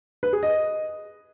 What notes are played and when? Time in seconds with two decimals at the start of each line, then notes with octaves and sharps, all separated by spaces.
0.23 B4
0.33 G#4
0.43 D#5